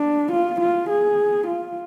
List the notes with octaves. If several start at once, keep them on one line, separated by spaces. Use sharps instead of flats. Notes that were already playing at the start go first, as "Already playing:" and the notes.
Already playing: D4
F4
F4
G#4
F4